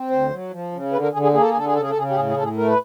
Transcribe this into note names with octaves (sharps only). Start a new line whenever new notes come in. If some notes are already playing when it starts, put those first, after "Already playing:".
Already playing: C4
D2 C5
F#3
F3
C#3
D3 B4
A#4
D3 G#4
G#4
A#3 G#4
A4
G#4
D3 A4
G#4
C#3 A4
G#4
A4
C#3 G#4
G4
A2 G#4
G#4
A2 A4
G#4
A3 A#4
B4